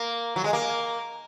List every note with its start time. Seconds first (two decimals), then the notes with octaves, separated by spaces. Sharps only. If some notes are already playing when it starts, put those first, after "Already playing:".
Already playing: A#3
0.36 F#3
0.44 G#3
0.53 A#3